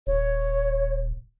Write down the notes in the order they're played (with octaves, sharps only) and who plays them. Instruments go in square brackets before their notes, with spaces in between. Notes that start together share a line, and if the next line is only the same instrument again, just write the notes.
[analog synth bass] D#1 [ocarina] C#5